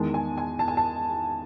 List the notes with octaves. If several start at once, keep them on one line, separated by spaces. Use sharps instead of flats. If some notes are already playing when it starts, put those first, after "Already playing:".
Already playing: E2 D#3 G#3 A5
G#5
G#5
A5
G#5
A5